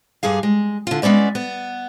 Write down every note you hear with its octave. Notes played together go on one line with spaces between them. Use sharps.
G2 G3 G#4 F5
G#3
D3 F4
G#3 B3 C#4 D5 E5
B3